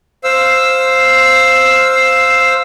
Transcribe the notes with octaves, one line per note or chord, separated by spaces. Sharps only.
C5 F5 E6